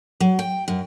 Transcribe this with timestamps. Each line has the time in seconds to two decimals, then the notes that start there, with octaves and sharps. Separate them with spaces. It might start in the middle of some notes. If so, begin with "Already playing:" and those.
0.20 F#3
0.39 G5
0.68 F#2